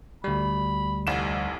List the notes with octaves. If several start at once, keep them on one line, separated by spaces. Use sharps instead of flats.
D2 G3 B5
F1 C2 E7